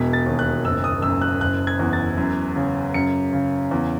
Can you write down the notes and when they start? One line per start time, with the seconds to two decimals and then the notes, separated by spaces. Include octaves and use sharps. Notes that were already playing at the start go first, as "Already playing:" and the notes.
Already playing: E1 B2 B6
0.13 A6
0.26 D#2
0.39 F#6
0.65 F#1 E6
0.84 D#6
1.02 F#2 E6
1.21 F#6
1.41 F#1 F#6
1.67 G#6
1.79 E2
1.93 A6
2.17 F#2
2.56 C#3
2.94 F#2 C#7
3.33 C#3
3.71 E2